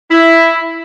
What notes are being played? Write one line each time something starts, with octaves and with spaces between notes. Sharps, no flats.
E4